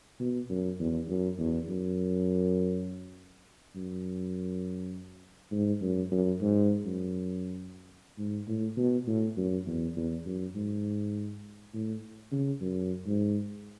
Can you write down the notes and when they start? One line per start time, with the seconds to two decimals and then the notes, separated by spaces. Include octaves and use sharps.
0.20 B2
0.50 F#2
0.80 E2
1.09 F#2
1.38 E2
1.69 F#2
3.75 F#2
5.52 G#2
5.82 F#2
6.12 F#2
6.41 G#2
6.86 F#2
8.19 G#2
8.48 A2
8.77 B2
9.07 A2
9.37 F#2
9.67 E2
9.97 E2
10.26 F#2
10.55 G#2
11.74 A2
12.32 C#3
12.61 F#2
13.06 G#2